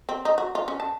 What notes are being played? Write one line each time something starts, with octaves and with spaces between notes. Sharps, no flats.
C4
D#4
F#4
F4
C#4
A5